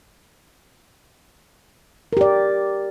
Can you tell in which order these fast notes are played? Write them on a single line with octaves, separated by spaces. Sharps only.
A#4 G4 D5